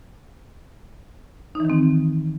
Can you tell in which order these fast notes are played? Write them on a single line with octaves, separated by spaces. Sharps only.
D#4 E3 D#3 C4